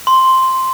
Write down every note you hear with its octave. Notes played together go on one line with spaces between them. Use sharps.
C6